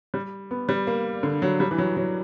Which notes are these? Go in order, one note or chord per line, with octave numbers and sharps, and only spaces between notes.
G3
B3
G3
A#3
D3
F#3
G3
E3
F#3
F#3